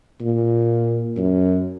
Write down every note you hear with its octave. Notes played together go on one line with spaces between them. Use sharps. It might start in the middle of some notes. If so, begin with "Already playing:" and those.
A#2
F#2